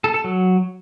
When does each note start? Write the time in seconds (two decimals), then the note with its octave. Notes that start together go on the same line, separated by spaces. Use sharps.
0.04 A4
0.14 A4
0.24 F#3